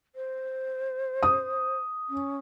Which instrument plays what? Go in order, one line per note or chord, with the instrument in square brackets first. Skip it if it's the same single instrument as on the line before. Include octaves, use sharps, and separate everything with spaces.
[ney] C5
[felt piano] D#6
[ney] C#4